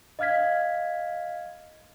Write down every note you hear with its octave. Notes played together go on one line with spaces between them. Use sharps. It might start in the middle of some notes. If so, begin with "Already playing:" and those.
D#5 F5 F6 G#6 B6